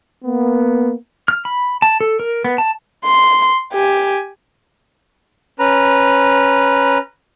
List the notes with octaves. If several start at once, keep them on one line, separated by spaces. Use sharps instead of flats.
A#3 B3
F6
B5
A5
A4
A#4
B3
A5
C6
G4 G#5
C#4 B4 A#5